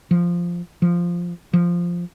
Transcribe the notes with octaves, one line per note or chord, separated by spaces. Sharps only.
F3
F3
F3